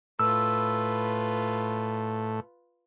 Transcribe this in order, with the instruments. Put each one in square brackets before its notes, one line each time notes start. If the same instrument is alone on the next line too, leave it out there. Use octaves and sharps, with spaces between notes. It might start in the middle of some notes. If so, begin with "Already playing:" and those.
[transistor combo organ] A2 [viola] F4 B4 [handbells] E6